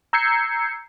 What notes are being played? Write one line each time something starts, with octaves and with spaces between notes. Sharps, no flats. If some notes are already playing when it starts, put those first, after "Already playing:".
A#5 E6 G6 G#6 C7 C#7